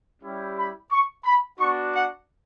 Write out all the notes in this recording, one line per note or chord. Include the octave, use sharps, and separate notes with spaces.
G3 C#4 E4 G4
B5
C#6
B5
B3 D4 F#4 C#6
F#5